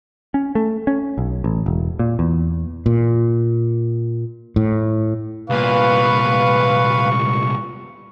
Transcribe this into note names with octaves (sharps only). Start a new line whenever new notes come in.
C#4
A3
C#4
B1
A1
E1
A#2
E2
A#2
A2
C2 A#2 B4 F5 C#6